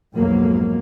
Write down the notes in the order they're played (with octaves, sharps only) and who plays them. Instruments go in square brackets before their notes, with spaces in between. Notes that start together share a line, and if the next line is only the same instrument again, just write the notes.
[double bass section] B1 F2 G#2 B2 F#3 A#3